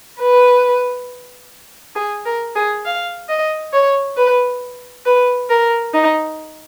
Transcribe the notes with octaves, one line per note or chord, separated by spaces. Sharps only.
B4
G#4
A#4
G#4
F5
D#5
C#5
B4
B4
A#4
D#4